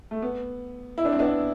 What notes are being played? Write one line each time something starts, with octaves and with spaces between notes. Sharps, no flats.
A3
B3
E4
D4
C4
B3 D4